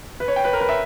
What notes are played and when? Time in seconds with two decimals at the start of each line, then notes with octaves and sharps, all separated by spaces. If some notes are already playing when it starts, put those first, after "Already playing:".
0.20 B4
0.28 C#5
0.36 G5
0.44 B4
0.53 A#4
0.61 B4
0.69 E5